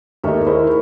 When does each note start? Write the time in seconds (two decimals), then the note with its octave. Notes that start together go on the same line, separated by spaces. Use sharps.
0.24 D#2 A3 D#4 A#4 C#5 E5
0.46 E4 G#4 C5